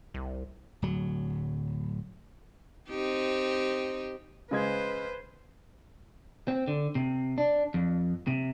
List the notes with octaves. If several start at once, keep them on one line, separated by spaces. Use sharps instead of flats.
C2
D1 F#3
C4 D#4 G4
C#3 G#3 B4 C5 G#6
C4
D3
C3
D4
F2
C3